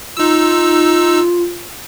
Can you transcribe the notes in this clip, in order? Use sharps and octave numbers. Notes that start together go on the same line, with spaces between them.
D#4 F4 E6